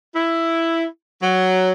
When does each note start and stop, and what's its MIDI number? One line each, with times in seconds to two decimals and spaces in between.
0.15 0.84 64
1.21 1.71 54